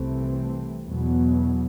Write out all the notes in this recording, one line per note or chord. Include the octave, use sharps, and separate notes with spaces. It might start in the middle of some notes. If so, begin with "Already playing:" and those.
Already playing: C2 C3 E3 A3 C4
E2 B2 F#3 B3